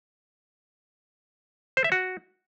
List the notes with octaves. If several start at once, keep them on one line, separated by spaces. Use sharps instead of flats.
C5
E5
F#4